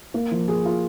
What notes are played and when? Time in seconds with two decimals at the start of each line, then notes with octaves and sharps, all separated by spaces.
0.14 A#3
0.31 F3
0.48 G#4
0.65 F4